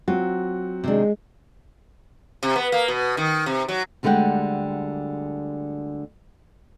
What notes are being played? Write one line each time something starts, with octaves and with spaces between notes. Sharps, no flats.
F#3 C4 F4 F#4
C3 D#3 G#3 D4
C3
B3
A#3
B2
D#3
C3
F#3
D2 D3 G3 G#3 F#5 G5